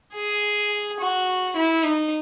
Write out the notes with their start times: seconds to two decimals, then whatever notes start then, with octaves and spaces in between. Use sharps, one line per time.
0.14 G#4
1.00 F#4
1.56 E4
1.84 D#4